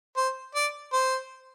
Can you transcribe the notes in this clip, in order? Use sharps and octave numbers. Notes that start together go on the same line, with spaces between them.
C5
D5
C5